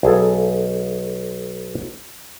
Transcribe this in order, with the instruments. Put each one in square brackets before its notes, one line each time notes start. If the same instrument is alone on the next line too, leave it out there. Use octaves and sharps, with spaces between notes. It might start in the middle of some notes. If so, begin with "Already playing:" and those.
[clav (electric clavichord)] B1 G#4 A4